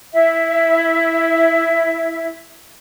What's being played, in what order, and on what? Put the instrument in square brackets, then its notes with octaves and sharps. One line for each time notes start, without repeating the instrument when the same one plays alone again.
[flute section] E4 E5